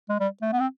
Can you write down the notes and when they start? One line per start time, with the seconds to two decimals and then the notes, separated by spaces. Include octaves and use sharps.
0.09 G#3
0.20 G3
0.42 A3
0.52 B3
0.60 C4